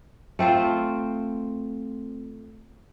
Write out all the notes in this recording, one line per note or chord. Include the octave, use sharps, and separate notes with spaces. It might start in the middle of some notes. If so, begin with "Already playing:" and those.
A3 C4 F4 C5